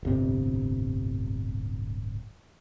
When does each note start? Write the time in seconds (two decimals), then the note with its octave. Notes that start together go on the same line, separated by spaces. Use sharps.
0.03 D1 G1 C3